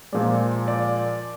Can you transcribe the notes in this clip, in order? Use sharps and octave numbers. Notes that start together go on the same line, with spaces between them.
A#2 F3 G#3 D5
D5